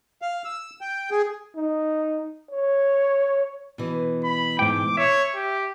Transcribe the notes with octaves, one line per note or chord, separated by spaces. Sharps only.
F5
E6
G5
G#4
D#4
C#5
B2 E3
B5
G#2 G5 D6
C#5 E5
G4